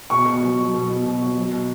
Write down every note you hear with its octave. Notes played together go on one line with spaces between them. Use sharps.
B2 C#6
B2
F#3
F#3
B2
B2
B2
F#3
F#3
B2